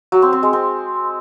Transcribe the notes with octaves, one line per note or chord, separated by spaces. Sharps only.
F#3
C4
C4
G#3
C4